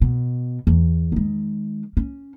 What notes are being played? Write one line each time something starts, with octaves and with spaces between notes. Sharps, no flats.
B2
E2
D#3 G#3
C#4